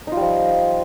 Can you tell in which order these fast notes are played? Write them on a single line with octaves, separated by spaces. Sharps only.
D#4 F4 G3 F3